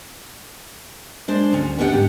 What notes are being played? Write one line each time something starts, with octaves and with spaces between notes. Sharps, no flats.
G#3 D4 C5
D2 C#4
B3 C#4 D4 G4 D#5 F#5
G#2 G4